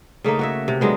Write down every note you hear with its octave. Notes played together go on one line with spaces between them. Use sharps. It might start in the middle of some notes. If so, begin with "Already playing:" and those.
C#3 A3 A#3 D#4
F#4 C#5 E5
C3
D3 F#3 G#3 B3